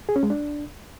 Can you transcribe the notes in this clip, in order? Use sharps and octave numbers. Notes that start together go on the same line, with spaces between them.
G#4
C#4
G#3
D4